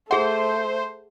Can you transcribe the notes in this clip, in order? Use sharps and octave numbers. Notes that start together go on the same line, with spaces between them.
A3 G#4 C5 F#5